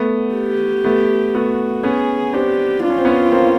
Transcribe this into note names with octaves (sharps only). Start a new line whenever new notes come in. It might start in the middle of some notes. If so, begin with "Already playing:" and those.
Already playing: A3 B3
G4
A3 B3
A3 B3 F#4
B3 C#4 G#4
C4 D4 G4
D4 F4
C#4
C4
B3 C#4
A#3 C4